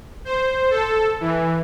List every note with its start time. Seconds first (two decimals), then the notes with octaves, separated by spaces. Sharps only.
0.25 C5
0.70 A4
1.21 E3